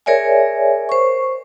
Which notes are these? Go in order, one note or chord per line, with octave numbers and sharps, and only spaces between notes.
G#4 A#4 C#5 D5 E5 G#5
C5 C#6